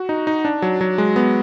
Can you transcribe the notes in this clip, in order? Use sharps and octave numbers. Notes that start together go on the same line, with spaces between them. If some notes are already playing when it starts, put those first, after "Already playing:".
Already playing: F#4
D#4
D#4
D4
F#3
F#3
G#3
B3